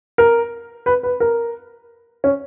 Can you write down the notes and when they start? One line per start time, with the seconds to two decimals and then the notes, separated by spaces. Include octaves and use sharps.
0.18 A#4
0.86 B4
1.03 B4
1.20 A#4
2.24 C#4